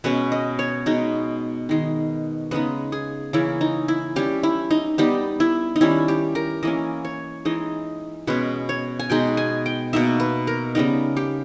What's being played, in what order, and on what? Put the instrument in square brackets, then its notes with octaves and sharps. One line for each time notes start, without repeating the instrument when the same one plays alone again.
[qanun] B2 G#3 C#4 B4
D#5
C#5
B2 G#3 D#4
D#3 G#3 D#4
C#3 G#3 B3 D#4 B4
G#4
C#3 E3 A#3 C#4 E4
D#4
E4
G3 C#4 G4
E4
D#4
G3 B3 D#4 G4
E4
D#4
D#3 G3 C#4 E4
G4
A#4
E3 A#3 C#4 D#5
C#5
E3 G#3 D#4 D#5
B2 G#3 C#4 B4
C#5
G#5
B2 G#3 D#4 G5
G#5
G5
B2 A#3 D#4 E5
B4
A#4
C#3 G3 B3 D#4 A#4
G4